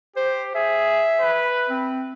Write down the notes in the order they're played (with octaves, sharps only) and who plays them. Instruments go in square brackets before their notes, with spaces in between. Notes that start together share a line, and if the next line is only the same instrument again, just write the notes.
[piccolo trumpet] G4 [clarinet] C5
[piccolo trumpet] G#4 [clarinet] E5
[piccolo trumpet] B4
[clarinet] C4